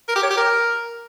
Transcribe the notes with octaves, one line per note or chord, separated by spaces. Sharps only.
A#4
G4
C#5
G4
A#4